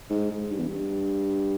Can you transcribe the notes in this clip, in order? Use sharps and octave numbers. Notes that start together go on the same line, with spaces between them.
G#2
G#2
G2
E2
G2